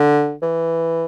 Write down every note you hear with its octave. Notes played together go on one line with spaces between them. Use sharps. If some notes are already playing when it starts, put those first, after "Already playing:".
Already playing: D3
E3